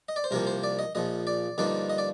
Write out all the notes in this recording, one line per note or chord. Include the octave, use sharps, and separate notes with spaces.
D#5
D5
C5
C2 C3 F3 A#3 A#4
C5
D5
D#5
A#1 A#2 F3 D#5
D5
G2 D3 F3 A#3 D#4 D5
D#5
D5